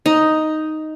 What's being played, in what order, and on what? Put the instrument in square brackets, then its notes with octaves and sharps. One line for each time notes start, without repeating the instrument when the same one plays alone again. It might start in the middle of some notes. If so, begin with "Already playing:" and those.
[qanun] D#4